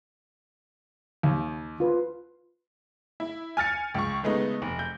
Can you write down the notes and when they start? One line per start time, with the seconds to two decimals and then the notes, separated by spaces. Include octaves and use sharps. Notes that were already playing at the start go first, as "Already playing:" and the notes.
1.23 D#2
1.80 F4 B4
3.20 E4
3.57 G#5 F6 A6 C#7
3.95 C#2 C#6
4.23 C#3 G#3 A3 B3 D#4
4.62 F1
4.79 G6